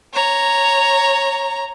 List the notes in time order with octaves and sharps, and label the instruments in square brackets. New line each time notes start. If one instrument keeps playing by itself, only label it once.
[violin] C#5 A#5